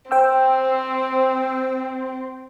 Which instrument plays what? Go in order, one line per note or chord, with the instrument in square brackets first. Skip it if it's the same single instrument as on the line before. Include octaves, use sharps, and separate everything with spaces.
[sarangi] C4 [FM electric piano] C5 G5 E6